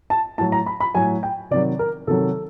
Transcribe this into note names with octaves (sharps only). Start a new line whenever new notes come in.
A5
A2 F#3 A5
A#5
B5
B5
A2 F#3 G#5
G5
C3 D#3 F#3 D5
A#4
C3 D#3 F#3 A4